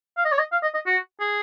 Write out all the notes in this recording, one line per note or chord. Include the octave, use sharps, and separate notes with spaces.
F5
D#5
C#5
D#5
F5
D#5
D#5
F#4
G#4